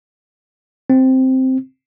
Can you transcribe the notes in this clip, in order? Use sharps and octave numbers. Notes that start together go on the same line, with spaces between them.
C4